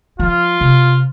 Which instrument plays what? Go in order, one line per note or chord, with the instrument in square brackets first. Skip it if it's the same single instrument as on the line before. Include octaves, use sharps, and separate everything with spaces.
[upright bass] F3 [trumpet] F4
[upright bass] C3